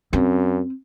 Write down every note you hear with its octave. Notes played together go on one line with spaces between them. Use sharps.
F#2 C4